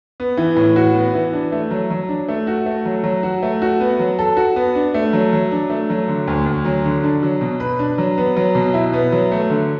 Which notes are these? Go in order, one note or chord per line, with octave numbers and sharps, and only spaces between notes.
B3
E3
A2
F#4
B3
E3
D4
A3
F#3
F#3
D4
A3
F#4
A3
F#3
F#3
F#4
A3
F#4
B3
F#3
A4
F#4
B3
D4
A3
F#3
F#3
D4
A3
F#3
D3
D2
D2
F#3
D3
D4
F#3
B2
B4
D4
F#3
B3
F#3
B2
E4
B3
F#3
A3
D3